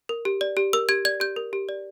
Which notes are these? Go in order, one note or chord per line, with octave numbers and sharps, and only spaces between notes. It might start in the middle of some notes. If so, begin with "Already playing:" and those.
A#4
G4
D5
G4
A#4 E6
G4 G#6
D5 G#6
G4 G6
A#4
G4
D5